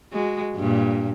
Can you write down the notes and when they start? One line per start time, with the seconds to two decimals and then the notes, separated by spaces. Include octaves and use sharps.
0.13 G#3 F#4
0.56 G2 A#2